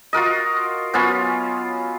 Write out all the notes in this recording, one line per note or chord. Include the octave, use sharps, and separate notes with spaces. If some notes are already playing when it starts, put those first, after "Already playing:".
F4 F#4 A#4 D#5
F#3 B3 C#4 F4